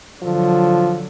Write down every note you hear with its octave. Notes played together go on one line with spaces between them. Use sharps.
D3 F3 F#3